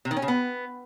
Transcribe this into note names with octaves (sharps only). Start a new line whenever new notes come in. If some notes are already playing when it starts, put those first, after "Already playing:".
C3
D#3
C#4
C#3
B3